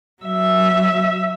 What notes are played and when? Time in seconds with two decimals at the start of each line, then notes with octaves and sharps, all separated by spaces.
0.22 F#3 E5